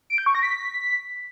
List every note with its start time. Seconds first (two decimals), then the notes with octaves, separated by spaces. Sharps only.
0.10 D7
0.18 G6
0.26 C#6
0.35 A#6
0.43 B6